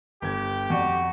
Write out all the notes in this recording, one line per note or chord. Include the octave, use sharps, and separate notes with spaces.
G1 G4 G#6
F2 F#4 D5